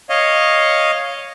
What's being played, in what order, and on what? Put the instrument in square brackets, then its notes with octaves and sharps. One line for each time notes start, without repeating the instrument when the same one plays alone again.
[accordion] C#5 D#5 F5